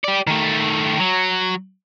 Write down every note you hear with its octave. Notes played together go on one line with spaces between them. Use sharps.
G4 D5
D#3 A3
F#3